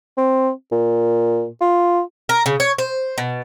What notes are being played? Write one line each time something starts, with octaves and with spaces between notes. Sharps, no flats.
C4
A#2
F4
A#4
C#3
C#5
C5
B2